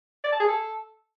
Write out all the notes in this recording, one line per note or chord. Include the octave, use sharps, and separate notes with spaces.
D5
A5
G#4
A4